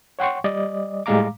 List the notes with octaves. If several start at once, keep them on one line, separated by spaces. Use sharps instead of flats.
C#5 F#5 G5 C6 C#6
G3 D5 D#5
A2 G3 G#3 F5 A#5 D6